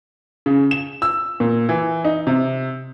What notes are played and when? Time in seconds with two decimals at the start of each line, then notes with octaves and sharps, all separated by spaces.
0.46 C#3
0.71 E7
1.02 E6
1.40 A#2
1.69 E3
2.05 D#4
2.27 C3